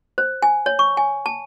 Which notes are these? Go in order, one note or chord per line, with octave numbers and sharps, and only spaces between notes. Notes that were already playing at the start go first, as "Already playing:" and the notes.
C5
G#5
C#5
C#6
G#5
A5